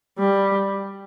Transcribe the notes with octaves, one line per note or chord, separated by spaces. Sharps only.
G3